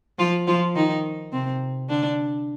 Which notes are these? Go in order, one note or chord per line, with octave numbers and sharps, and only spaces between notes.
F3 F4
F3 F4
D#3 D#4
C3 C4
D3 D4